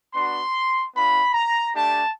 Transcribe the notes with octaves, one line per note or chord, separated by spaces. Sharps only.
B3 D4 F#4 C6
B3 D4 F4 B5
A#5
A3 D4 G4 A5